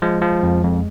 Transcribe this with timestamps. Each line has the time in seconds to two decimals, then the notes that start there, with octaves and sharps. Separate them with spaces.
0.02 F3 G#3
0.22 F3
0.43 F2
0.63 F2